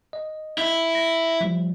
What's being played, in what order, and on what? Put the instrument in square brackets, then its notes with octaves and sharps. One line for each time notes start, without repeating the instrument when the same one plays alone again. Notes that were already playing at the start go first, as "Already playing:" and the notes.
[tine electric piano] D#5
[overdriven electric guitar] E4
[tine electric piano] A#6
F3 G3